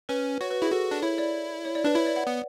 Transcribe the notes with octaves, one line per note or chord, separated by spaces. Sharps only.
C#4 B4
F#4 C#5
B4
E4 G#4
F#4 A4
D4
E4 C#5
D5
C#5
D5
D4 B4
E4 C#5
D5
F#5
B3